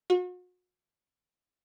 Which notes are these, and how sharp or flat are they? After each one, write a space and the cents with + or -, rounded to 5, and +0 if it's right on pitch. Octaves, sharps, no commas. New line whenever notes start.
F#4 -40